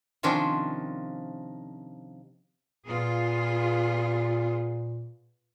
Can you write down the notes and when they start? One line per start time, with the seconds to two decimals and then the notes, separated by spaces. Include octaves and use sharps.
0.23 C3 D#3 F3 C#4 D4
2.86 A#2 B3 F4 G#4